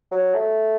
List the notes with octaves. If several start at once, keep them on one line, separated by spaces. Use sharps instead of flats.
F#3
A3